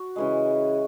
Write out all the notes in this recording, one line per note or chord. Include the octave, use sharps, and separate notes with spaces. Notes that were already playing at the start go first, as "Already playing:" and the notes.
Already playing: F#4
C#3 E3 G#3